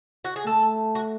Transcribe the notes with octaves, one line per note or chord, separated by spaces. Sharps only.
F#4
G#4
A3 A4
F#4